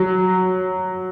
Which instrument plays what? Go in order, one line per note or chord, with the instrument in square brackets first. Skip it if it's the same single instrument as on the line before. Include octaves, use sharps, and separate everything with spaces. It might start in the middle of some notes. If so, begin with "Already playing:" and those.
Already playing: [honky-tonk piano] F#3